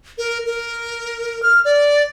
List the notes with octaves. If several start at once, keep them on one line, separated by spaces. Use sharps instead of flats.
A#4
A#4
F6
D5